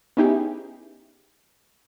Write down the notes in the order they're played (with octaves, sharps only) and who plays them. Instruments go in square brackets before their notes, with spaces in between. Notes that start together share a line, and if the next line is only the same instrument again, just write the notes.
[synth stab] B3 C#4 D#4 E4 G4 G#4